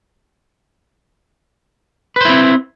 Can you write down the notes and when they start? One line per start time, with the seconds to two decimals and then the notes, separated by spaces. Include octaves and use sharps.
2.16 B4
2.21 C5
2.25 E4
2.30 C4